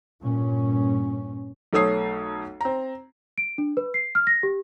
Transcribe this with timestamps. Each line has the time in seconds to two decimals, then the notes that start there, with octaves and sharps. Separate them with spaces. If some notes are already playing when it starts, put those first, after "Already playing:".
0.22 G2 A#2 C#4
1.73 B1 A3 A4 C#5 D#6 C7
2.61 C4 A#5
3.38 D7
3.58 D4
3.77 B4
3.94 C7
4.15 F6
4.27 A#6
4.43 G4